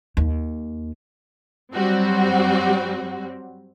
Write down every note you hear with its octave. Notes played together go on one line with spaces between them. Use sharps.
D#2
G2 F#3 G3 C4 F#4